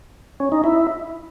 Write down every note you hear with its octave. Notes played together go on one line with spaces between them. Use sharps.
C#4
D#4
E4